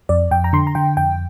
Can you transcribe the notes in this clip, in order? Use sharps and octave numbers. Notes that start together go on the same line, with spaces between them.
F2 D5
F2 G5
A#5
D3 C6
A#5
D3 G5
F2 G5